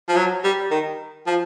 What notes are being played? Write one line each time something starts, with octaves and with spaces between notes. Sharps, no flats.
F3
F#3
G3
D#3
F3